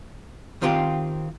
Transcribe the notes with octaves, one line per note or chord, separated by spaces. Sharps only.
D#3 C4 F4 G4